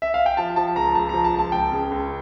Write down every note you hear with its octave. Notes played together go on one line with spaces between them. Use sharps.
E5
F5
G5
F3 A5
F3 A5
C#2 A#5
C#2 A5
F3 A#5
A5
C#2
A5
C#2 G5
C#3
C#2